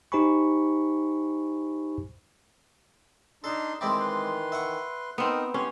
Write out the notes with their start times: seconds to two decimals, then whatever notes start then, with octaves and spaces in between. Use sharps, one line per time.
0.12 D#4 G4 C5 G#5 B5 C#6
3.44 D4 D#4 A4 C6
3.81 D#3 E3 G#3 C4 D4 E5 G5 B5
4.00 B4 C6
4.52 E5 F#5 C#6
5.18 B3 C4 D#4 A#4 D#6
5.54 E3 C#4 G4 C6